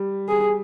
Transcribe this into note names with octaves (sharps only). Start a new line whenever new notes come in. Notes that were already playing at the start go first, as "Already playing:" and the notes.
Already playing: G3
G#4